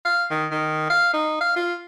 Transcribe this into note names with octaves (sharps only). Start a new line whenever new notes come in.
F5
D#3
D#3
F5
D#4
F5
F4